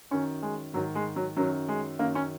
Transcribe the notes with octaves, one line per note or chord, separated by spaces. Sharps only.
F#2 D#3 C#4
G#3
G#2 D#3 F#3
G#3
F#3
F#2 D#3 F#3
G#3
F#2 D#3 A#3
C#4